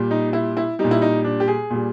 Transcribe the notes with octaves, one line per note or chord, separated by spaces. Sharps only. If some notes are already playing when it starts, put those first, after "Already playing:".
Already playing: A#2 G3
D#4
E4
E4
A#2 G3 D#4
E4
D#4
D4
G4
G#4
A#2 G3